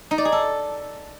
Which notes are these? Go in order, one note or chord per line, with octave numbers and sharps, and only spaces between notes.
D#4
D5
G#4
A4